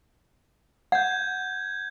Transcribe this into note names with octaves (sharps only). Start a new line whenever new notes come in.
F#5 G6 G#6